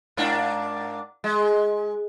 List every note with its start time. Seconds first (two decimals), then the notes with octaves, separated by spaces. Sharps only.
0.17 G#2 A#3 D4
1.24 G#3